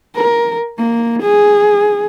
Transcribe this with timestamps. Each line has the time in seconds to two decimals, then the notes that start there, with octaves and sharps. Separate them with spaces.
0.15 A#4
0.78 A#3
1.22 G#4